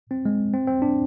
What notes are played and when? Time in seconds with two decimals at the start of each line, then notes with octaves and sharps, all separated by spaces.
0.11 C4
0.26 G#3
0.53 C4
0.67 C4
0.82 D4